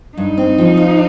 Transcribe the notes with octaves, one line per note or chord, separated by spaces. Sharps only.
G2 D#4
C4
F3
F4